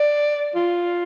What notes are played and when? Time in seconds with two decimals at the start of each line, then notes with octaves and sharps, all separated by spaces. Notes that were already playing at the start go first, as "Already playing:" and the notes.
Already playing: D5
0.56 F4